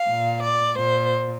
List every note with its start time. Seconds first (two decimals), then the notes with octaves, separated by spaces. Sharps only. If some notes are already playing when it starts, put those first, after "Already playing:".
Already playing: F5
0.11 A#2
0.44 D5
0.78 A#2 C5